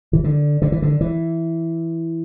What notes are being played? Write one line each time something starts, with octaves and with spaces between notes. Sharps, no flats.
E3
D3
D3
E3
D3
E3